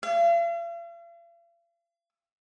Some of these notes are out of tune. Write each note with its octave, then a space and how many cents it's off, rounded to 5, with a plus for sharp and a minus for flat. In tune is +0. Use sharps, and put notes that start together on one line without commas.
F5 -45